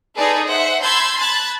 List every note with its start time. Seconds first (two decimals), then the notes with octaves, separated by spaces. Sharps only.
0.16 D#4 G#4 A4 B4 D5
0.47 C5 E5 F#5
0.82 A5 B5 C6 E6 G6 G#6
1.19 A5 B5 F#6 G#6 A6